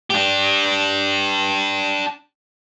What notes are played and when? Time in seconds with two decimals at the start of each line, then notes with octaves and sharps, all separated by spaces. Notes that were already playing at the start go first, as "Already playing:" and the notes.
0.10 D4 G4